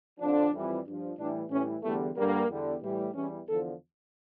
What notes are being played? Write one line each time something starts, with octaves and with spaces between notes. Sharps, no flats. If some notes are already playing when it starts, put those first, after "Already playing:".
F2 D3 F3 D4
F2 E3 G3
G2 F3
A2 E3 G3 D4
A2 E3 G3 C#4
E2 D3 G3 A3
G2 D3 G3 A#3
E2 D3 G3
A2 E3 G3
E2 E3 G3 C#4
E2 D3 F3 A4